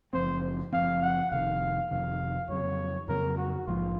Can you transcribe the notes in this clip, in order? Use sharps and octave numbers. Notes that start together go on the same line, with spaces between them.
F#1 F#2 F3 C4 C5
F#1 F#2 F3 C4 F5
F#5
F1 F2 C3 D#3 F5
F1 F2 C3 D#3 F5
F2 C#3 F#3 C4 C#5
F2 C#3 F#3 C4 A#4
F#4
A#1 G#2 F3 F4